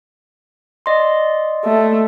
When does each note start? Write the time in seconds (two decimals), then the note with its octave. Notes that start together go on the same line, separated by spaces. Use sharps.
0.86 D5 D#5 C6
1.64 A3